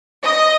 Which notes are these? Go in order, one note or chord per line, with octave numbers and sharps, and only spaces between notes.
D#5